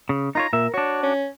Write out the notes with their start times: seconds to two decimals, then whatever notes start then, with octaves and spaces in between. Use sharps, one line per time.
0.09 C#3
0.35 D#4 F4 C#5 A#5
0.53 A#2 A#4 E5
0.74 D4 F#4 C#5
1.03 C#4